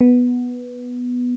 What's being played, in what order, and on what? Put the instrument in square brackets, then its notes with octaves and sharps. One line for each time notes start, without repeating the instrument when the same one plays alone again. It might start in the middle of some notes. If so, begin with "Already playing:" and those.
[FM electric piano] B3